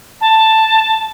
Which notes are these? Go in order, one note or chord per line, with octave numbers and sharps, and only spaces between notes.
A5